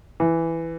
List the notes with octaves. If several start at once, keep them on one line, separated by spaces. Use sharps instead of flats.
E3